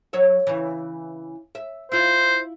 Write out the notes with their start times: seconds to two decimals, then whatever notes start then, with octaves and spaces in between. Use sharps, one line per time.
0.13 F#3 C#5 E5
0.47 C#3 E3
1.55 E5
1.92 E4 F4 C5